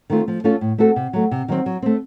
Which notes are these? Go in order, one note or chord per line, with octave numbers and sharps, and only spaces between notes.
D#3 A3 C4 F4
F3
A3 C#4 F4 A4
A2
A3 C4 F#4 A4
C3
F#3 A3
C3
D#3 F#3 C4
F#3
A3 C4